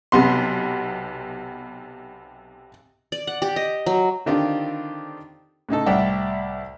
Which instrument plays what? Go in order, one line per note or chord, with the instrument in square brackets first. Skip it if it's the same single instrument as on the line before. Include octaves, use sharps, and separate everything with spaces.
[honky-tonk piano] B1 C3 B3 C6
[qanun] D5
F#5
G4
D#5
F#3
[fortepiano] D3 D#3 C4 D4 F4 G4
A2 C#3 D#4 A4
C2 A2 D5 E5 F#5 G5